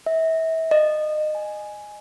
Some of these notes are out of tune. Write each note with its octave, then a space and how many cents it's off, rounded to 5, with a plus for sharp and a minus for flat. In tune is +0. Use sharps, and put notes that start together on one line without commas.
E5 -35
D#5 -25
G#5 +5